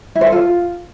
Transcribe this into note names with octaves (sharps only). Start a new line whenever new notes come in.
E4
C5
A4
F4